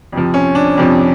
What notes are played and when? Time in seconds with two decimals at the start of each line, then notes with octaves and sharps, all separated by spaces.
0.13 F2 C3 F3
0.34 C#4
0.55 D4
0.78 F2 C3 F3